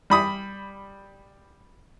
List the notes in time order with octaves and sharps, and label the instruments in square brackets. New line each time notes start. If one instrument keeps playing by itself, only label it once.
[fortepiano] G3 B5 D#6